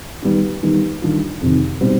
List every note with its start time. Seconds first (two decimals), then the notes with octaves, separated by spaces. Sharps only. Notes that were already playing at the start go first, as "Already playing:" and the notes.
0.22 D#3 G3 B3 D#4
0.63 D#3 G3 B3 D#4
1.02 D#3 G3 D4 F4
1.41 F2 C3 D#3
1.81 B2 G3 C4 D#4